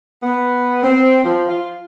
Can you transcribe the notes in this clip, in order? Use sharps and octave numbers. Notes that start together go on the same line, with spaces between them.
B3
C4
F3
F4